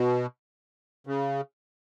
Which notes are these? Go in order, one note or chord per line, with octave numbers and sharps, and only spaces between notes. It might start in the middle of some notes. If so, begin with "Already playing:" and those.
Already playing: B2
C#3